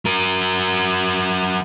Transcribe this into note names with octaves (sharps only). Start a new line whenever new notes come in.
F#3 A#4